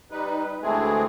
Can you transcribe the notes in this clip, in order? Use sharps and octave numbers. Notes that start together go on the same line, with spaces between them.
G3 D#4 B4
D2 E3 G#3 A3 C4 G#4